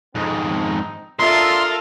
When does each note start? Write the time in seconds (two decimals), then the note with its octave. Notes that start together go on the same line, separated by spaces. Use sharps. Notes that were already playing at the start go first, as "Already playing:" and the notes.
0.15 F2 G#2 C4 D#4
1.19 D4 F4 A4 A#4 D#5 E5 C6